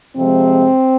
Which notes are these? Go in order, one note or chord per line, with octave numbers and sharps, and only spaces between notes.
F2 C3 F3 G#3 C4